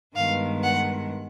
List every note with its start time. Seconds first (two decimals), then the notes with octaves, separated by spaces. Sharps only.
0.16 G2 D#3 G#3 B3 F5
0.63 F#5